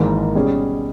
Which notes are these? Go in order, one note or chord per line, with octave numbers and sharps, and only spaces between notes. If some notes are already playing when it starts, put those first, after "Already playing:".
Already playing: G#1 G#2 E3 A#3 D#4
B2 G3 C#4 G#4